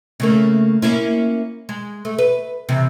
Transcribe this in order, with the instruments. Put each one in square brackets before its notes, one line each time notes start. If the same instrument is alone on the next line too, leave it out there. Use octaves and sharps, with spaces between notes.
[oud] C#3 A3 A#3
A#3 C#4 E4
G#3
A3
B4
C3 E3